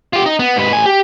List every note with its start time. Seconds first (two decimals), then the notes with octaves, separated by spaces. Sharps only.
0.13 F4 G4
0.26 D#4
0.39 B3
0.56 G#2 B4
0.72 A2 G#5
0.86 G4